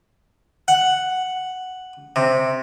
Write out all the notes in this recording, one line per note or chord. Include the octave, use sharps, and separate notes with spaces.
F#5
C3